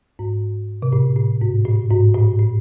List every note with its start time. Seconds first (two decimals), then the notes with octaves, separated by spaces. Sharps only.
0.19 G#2
0.82 C3
0.93 A2
1.17 A2
1.41 G#2
1.66 A2
1.90 G#2
2.15 A2
2.39 A2